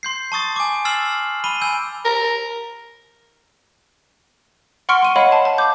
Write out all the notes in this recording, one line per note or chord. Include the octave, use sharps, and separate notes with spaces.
C6 G6 C7
A5 C#6 D#6 A6
G#5 D6
E6 F6 A6 C7 E7 F#7
B5 D#7 G7
G#5 E6 G6
A#4
F#5 C6 C#6 F6 C#7 D7
C6 D#7
C#5 D#5 F5 F#5 B5
F5 A5
A5
D6 G6